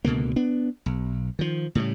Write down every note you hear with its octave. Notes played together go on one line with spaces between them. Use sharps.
C#2 B2 D3 A#3
B3 D4
B1
D#3 F3
A2 C#3 F#3 G3